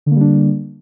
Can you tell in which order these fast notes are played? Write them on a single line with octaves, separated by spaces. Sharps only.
D3 A#3 G3 D4